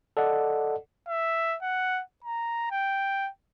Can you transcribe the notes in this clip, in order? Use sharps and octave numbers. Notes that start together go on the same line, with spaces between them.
A4 D5 D#5 F#5
E5
F#5
A#5
G5